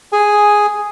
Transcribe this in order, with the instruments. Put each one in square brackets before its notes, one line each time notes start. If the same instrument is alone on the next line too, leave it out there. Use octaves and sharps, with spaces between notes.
[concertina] G#4 G#5